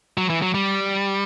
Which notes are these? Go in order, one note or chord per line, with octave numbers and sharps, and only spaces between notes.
F#3
E3
F#3
G3